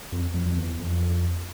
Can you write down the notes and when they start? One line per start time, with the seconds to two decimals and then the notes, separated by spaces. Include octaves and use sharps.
0.12 F2
0.34 F2
0.46 F2
0.56 E2
0.79 F2